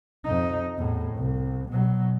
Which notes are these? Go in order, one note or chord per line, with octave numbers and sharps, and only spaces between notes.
F2 D#4
E2 A2
C2
B2 F#3